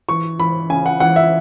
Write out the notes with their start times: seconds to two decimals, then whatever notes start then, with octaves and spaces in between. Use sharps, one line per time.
0.09 E3 C#6
0.39 E3 B5
0.70 C#3 G#5
0.86 F#5
1.00 E3 F#5
1.16 E5